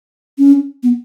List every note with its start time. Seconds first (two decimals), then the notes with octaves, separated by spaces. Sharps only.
0.38 C#4
0.83 B3